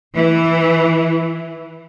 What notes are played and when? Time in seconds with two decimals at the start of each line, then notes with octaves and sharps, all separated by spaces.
0.15 E3